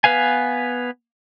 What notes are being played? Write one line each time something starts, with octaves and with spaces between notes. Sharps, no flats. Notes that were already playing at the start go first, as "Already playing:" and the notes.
B3 B4 F5 G#5